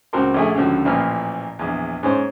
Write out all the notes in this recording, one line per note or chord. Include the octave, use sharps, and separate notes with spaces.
C#2 C4 F#4 A#4 C6
A#1 A3 G#4
C#2 D3 F3 F#4
A1 A#2 F3 B4 F6
A#1 E2
G#2 C#4 C5